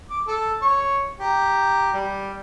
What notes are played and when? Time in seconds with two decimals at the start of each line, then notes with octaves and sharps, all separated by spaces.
0.10 D6
0.27 A4
0.62 C#5
1.20 G4 A#5
1.93 G3